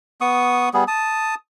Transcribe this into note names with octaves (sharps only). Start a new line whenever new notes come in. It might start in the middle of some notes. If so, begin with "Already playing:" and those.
B3 C#6 D#6
G3 B3 G#4
A5 D#6